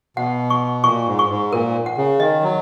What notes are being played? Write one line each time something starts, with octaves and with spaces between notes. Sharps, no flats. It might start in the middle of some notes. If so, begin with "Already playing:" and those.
B2 F#5
C#6
A#2 C#6
G#2
C#6
G#2
A#2 A#4
F#5
C#3
D#3 D#5
F#3